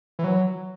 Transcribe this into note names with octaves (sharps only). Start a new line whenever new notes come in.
E3
F#3